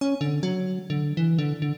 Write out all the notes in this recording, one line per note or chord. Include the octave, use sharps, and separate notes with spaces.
C#4
D3
F#3
D3
E3
D3
D3